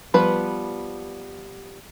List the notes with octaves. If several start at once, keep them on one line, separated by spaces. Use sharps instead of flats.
F3 G3 B3 B4 B5